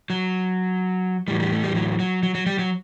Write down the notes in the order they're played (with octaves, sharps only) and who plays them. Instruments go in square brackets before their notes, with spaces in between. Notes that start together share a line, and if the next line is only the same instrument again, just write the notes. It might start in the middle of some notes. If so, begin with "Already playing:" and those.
[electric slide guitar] F#3
A2 E3 G3
G3
A3
G3
F#3
F#3
F#3
F#3
G3
F#3